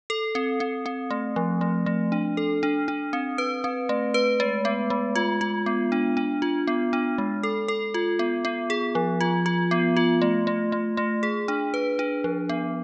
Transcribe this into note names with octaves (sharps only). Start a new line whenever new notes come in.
A4
C4
C4
C4
A3
F3
A3
A3
D4
A4
D4
D4
C4
B4
C4
A3
B4
G#3
B3
G#3
F4
F4
B3
D4
D4
F4
B3
D4
G#3
A4
A4
F4
B3
B3
G#4
F3
F4
F4
B3
F4
A3
A3
A3
A3
G#4
D4
B4
D4
F3
B3